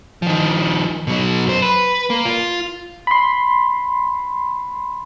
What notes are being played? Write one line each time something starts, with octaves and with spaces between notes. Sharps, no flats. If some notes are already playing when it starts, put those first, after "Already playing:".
D#3 F3
B2 F#3
F#2 C5
B4
A#3
F4
B5 C6